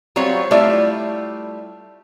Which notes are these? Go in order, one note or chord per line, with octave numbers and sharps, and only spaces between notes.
F#3 G3 C4 F4 C#5
G3 A3 E4 F4 D5 E5